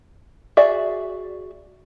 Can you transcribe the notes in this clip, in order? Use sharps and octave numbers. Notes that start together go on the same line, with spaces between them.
F#4 G#4 D5 E5